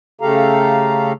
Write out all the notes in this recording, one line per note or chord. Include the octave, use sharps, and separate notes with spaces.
C#3 A3 G4 A4 F5 A#5